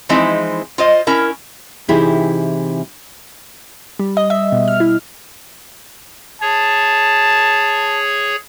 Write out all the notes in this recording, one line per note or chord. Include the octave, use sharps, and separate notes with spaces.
E3 F3 G#3 C4 D#4 E4
F4 C5 D#5
C#4 E4 A#4
C3 E3 D#4 E4 G4 G#4
G3
D#5
E5
B2
F6
E4
G#4 C#5 A5